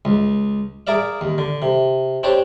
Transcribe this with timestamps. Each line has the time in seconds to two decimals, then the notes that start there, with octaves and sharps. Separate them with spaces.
0.05 C#2
0.87 G#4 A#4 D5 E5 F5
1.21 D#2
1.38 D3
1.62 C3
2.23 C4 D4 G4 C5 C#5